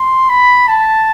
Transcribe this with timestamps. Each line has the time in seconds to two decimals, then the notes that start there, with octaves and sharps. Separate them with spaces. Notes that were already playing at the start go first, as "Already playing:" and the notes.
Already playing: C6
0.29 B5
0.68 A5